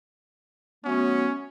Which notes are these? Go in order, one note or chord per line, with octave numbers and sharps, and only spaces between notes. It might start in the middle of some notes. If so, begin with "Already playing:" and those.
F#3 A3 B3 C#4